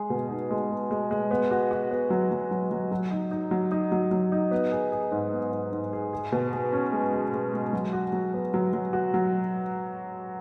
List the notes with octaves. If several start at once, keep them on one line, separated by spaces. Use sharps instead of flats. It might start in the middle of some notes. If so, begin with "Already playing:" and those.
Already playing: G#3 G#4
B2
D#4
G#3
G#4
G#3
G#3
B3
F#4
F#4
B3
F#3
F#3
F#3
F#3
F#3
D#4
D#4
F#3
D#4
F#3
F#3
D#4
B3
G#4
G#4
G#2
B3
G#2
G#2
G#4
G#4
B2
G#4
C#4
G#3
G#4
G#3
G#3
F#3
F#4
F#3
B3
F#3
F#3
F#4
F#3